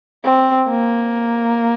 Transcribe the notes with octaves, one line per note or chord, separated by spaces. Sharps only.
C4
A#3